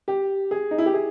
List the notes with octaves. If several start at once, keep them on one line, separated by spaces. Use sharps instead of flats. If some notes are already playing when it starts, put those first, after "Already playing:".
G4
G#4
D#4
E4
G4
G#4